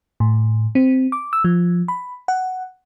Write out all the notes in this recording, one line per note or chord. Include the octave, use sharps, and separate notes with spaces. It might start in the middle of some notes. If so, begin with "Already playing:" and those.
A2
C4
D6
E6
F3
B5
F#5